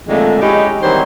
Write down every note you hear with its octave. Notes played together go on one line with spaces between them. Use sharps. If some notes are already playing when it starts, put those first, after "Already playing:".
F2 A#2 D3 D#3 G#3 A3
G#3 C#4 D#4 E4 G4
D#3 E3 F#3 G3 C4 C5